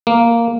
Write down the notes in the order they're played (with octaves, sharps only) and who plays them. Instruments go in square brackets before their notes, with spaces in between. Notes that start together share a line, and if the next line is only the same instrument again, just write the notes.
[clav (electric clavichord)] A#3